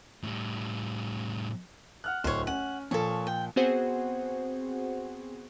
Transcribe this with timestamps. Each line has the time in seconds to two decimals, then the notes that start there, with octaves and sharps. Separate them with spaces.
0.23 A2 G3
2.04 F#5 F6 F#6
2.24 D1 C5 C#5
2.47 C#4 F#5
2.91 A#2 F3 A4 C#5
3.27 G5
3.56 B3 C4 F#4 G#4 C5 F#5